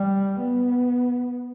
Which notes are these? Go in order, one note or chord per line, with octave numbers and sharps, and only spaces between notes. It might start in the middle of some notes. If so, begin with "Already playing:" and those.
Already playing: G3
B3